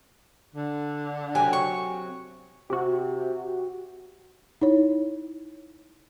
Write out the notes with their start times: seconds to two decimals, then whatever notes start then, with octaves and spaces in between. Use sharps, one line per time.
0.54 D3
1.35 C3 F#3 G4 G#5
1.53 C#6
2.70 C3 F#4 G4
4.61 D#4 E4 C#5